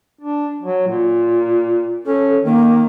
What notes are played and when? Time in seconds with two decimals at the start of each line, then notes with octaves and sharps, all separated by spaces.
0.21 D4
0.62 F#3
0.87 A#2
2.06 C#4 A4
2.45 D#3 A#3